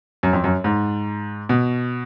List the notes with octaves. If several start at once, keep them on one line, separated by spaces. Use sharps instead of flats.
F#2
F2
F#2
G#2
B2